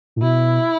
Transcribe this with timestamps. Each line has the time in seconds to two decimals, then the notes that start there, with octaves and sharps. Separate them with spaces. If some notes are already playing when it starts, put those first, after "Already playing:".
0.16 A2
0.22 B2 E4